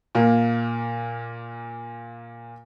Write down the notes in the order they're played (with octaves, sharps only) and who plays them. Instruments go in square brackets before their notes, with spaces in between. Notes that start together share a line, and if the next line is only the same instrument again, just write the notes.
[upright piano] A#2 A#3